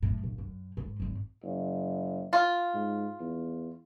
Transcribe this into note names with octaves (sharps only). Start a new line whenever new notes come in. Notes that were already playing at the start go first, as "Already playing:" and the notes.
F#2 A2
A#1
F#2
G#2
G#1 D#2
F#1
F4
G#2
E2